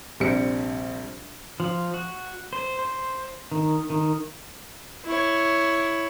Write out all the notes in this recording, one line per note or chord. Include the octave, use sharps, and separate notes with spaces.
A#1 C3 G3 C4 C#7
F3
F#4
C5
C5
D#3
D#3
E4 C#5